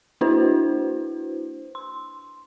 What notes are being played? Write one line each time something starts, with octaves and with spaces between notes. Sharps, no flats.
A#3 D4 E4 F#4 B4 C5
C6